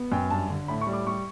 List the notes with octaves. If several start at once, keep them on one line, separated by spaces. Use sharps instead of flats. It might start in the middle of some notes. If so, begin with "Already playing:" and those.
Already playing: B3
F#2 G5
G2 A5
D3
A2 B5
C#6
G3
D6
G3 C#6